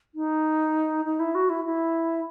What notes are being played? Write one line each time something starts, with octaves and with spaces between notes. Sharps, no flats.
D#4
D#4
E4
F#4
E4
E4